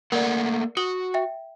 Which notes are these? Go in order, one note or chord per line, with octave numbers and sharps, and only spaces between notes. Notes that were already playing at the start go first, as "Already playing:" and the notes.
A3 A#3 A#4 D5 F#5
F#4 D#6 F#7 G7
E5 G5